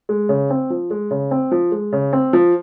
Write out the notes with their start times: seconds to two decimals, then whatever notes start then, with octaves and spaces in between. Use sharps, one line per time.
0.09 G#3
0.29 C#3
0.50 C4
0.70 F3
0.90 G#3
1.11 C#3
1.31 C4
1.52 F3
1.71 G#3
1.93 C#3
2.13 C4
2.33 F3